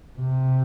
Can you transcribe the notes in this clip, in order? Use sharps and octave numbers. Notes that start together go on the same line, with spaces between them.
C3